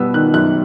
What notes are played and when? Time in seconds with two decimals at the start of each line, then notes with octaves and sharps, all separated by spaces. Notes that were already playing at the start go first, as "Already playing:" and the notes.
Already playing: B2 G3 B3 E6
0.14 D#3 F#6
0.34 F#2 F#6